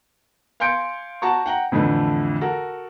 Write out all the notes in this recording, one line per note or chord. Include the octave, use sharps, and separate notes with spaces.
F5 G#5 C6 G6 C#7 D7
F#4 A5 A#5 C#6
F#5 G5 A#5
F2 A2 D3 E3 A3
F#4 A4 A#4